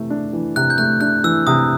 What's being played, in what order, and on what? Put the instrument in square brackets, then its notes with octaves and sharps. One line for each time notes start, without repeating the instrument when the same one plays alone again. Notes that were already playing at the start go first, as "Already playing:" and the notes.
Already playing: [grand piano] C3 E3 A3
D4
E3
[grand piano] C3 [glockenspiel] F#6
[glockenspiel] G6
[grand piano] A3 [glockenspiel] F#6
[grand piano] D4 [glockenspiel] F#6
[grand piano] E3 [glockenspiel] E6
[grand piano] C3 [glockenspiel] D#6